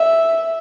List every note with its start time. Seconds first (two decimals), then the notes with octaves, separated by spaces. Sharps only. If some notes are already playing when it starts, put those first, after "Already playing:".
Already playing: E5